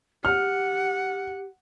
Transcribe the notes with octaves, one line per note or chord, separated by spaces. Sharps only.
G4 F#5 F6